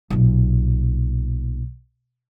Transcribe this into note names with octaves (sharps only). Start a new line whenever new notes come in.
B1 A#2